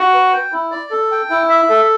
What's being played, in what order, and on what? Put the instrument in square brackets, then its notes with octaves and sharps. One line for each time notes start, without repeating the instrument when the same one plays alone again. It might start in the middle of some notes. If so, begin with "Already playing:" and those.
Already playing: [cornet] F#4
[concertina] B4
G5
E4
D5
A4
G5
E4
E5
A4